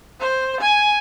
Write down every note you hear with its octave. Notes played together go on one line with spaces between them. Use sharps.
C5
G#5